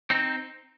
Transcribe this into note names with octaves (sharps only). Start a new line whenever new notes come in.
C4 D#4